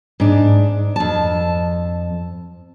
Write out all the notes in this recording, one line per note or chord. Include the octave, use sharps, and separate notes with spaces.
G#2 D4
F2 A5